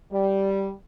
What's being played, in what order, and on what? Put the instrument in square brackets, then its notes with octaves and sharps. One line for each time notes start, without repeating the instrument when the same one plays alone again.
[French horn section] G3